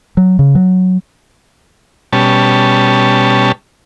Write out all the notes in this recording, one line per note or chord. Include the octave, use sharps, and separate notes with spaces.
F#3
C#3
F#3
B2 G3 C#4 A5